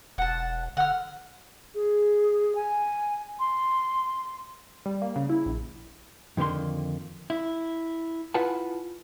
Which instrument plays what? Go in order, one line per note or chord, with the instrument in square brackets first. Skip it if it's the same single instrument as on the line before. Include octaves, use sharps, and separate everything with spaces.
[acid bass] E1 [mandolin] F#5 A5
[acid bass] D3 [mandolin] F#5 F6
[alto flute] G#4
G#5
C6
[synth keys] G3
A#3
C#3
E4
A#1
[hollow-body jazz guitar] F2 D3 D#3 A#3 C6
E4
E4 F4 B4 F#5 G#5 A5